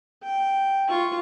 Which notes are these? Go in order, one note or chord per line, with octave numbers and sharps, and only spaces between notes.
G5
F4 C#6